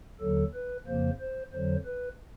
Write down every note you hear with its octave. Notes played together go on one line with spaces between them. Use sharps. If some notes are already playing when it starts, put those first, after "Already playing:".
D#2 D3 F#3 A4
B4
F2 C#3 F3 A#3 C5
C5
F2 D3 F#3 C5
B4